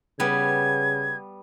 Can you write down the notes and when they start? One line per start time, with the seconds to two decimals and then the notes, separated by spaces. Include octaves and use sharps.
0.20 C#3 G3 B3 G#6